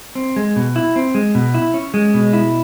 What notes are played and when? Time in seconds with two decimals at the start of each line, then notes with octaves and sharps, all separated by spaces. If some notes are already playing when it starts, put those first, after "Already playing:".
0.15 C4
0.36 G#3
0.56 B2
0.76 E4
0.96 C4
1.15 G#3
1.35 B2
1.55 E4
1.74 C#4
1.94 G#3
2.14 B2
2.33 E4